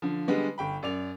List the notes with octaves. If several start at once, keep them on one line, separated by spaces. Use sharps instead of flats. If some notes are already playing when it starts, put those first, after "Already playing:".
D3 F3
D3 G3 G#3 B3
G1 G5 B5
F#2 D5 F7